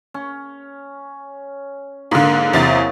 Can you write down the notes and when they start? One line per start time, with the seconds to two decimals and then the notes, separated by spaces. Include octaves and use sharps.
0.14 C#4
2.11 G#2 D3 A#3 F4
2.53 E2 C3 F#3 A6